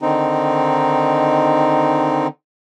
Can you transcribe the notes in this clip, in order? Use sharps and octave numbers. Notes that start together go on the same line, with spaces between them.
D3 D#3 C4 D#4